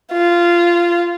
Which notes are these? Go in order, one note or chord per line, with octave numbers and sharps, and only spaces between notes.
F4